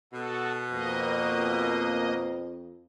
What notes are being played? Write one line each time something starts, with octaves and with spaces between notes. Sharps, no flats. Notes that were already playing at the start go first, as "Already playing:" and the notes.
B2 F#4 A4
F2 A#3 D#5